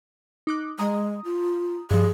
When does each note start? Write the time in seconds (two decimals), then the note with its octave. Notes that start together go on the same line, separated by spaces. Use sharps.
0.47 D#4 D6 F#6
0.79 G#3 A#5 D#6
1.24 F4
1.91 G2 F3 G#4